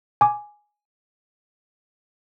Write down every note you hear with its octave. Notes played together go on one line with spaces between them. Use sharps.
G#5 D6